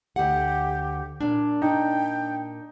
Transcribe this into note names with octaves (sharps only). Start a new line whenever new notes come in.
D2 G4 F#5
A#2 D4
D#4 G5